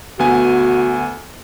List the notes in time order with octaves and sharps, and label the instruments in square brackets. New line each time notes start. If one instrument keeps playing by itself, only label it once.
[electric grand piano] D2 B3 G#5 [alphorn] F#4